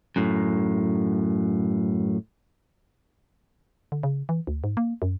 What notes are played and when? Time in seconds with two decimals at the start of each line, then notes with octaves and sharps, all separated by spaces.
0.16 F#2 A2
3.92 D3
4.03 C#3
4.29 E3
4.47 D2
4.64 G#2
4.77 A#3
5.02 F#2